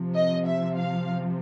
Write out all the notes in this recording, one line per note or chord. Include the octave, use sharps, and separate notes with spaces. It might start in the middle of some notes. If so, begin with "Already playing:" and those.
Already playing: C3 F3
D#5
E5
F5